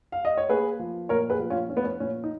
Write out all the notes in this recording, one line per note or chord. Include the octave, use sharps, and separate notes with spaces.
F5
D#5
C#5
A#3 G#4 B4
F3
A#2 A#4 C#5
G#4 B4
F3
C#4 F4
F3 C#4
B3
C#4
A#2 C#4
D#4